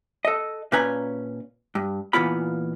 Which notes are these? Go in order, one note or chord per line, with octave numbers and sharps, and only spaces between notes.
A4 D#5
A#2 C#4 B4 G#5 A#5
G2
A#2 E3 B3 F4 B5